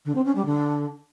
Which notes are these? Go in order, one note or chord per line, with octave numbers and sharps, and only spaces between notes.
D3
C4
C#4
G3
D3